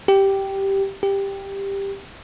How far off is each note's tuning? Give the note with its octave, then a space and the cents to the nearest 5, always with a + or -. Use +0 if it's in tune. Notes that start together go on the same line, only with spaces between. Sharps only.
G4 -5
G4 +10